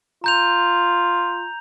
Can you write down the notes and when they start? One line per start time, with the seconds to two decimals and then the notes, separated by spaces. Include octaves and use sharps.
0.24 F4 A#5 G6 F7